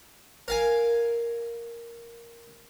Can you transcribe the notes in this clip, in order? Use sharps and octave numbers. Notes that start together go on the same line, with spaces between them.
A#4 F5 G#5